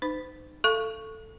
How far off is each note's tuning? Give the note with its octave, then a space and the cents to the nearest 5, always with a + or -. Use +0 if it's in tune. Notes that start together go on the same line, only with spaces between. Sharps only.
D#4 -30 C5 -40
A4 +5 F5 -20 C#6 +0